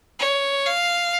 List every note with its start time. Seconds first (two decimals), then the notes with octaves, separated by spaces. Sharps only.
0.20 C#5
0.66 F5